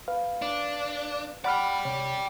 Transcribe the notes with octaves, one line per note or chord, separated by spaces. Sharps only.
B4 F5
D4
D5 F#5 G5 B5 F6
C3 C#5